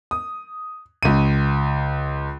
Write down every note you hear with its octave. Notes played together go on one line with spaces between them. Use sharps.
D#6
C#2 D#7